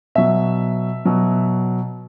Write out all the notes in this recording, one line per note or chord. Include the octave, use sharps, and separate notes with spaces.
B2 F#3 E5
B2 F#3